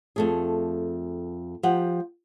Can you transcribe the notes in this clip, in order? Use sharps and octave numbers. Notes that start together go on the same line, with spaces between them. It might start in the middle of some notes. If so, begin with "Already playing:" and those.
F2 A3 G#4
F3 G4 F#5